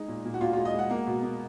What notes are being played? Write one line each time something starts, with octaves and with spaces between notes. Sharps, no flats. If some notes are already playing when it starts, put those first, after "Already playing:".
Already playing: G#3 D#4
A#2
A#2
F#4
A#2 F4
F4
G#3
D#5
G#3 F#5
A#3 F#5
B2
A#3